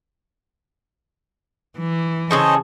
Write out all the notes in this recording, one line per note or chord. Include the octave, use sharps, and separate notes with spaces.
E3
C#3 G#4 A4 C5 C#5 D#5